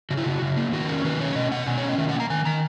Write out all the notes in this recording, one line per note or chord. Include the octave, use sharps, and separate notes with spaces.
C#3 F#4
E4
C#3 F#4
C#3
A#3
D#3 F#4
C#4 A#4
D#3 B4
C#4 C#5
B2 D#5
B2 F#5
B2 G#5
C#5
C#4
D#5
D#3 E5
F#5
A#3
A#5
D#3 G#5
D#3 A#5